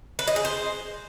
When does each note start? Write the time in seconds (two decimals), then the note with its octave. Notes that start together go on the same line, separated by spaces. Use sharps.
0.19 B4
0.27 D#5
0.36 G#4
0.45 C5